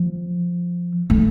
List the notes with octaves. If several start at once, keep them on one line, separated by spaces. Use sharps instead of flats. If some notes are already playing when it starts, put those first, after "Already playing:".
Already playing: F3
A3